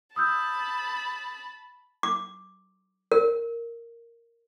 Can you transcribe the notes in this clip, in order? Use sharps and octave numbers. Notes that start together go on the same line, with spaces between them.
A5 B5 D#6 E6 G6
D6
A#4